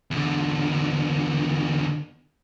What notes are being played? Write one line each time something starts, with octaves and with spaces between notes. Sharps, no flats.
E2 D3